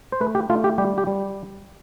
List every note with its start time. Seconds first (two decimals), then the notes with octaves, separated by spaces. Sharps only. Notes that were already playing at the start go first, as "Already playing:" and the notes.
0.12 C5
0.21 A3 B4
0.35 G4
0.50 A3 F4
0.64 G4
0.78 G3 G4
0.98 G4
1.07 G3